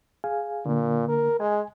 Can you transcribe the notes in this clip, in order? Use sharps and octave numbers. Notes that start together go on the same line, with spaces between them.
G#4 F5 G#5
A#2 D3 A#3
A#4
G#3 G#5